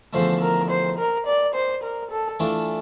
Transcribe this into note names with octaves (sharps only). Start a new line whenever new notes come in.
E2 D3 F3 A3 C5
A#4
C5
A#4
D5
C5
A#4
A4
E3 A3 D4 F4